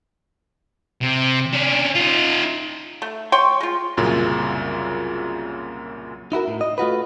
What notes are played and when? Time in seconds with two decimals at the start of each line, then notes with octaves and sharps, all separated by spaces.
1.03 C3
1.53 C#4 D4
1.96 D#4 F4
3.02 A3
3.32 C#5 G5 C6
3.60 G#3 F4
3.97 C2 F#2 A#2 C#3
6.32 D#4 E4 F#4 A#4
6.48 A2
6.61 D#5
6.78 A3 F4 F#4 B4